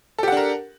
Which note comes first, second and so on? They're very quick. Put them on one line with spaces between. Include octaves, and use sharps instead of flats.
A4 G4 F#5 D4 A#4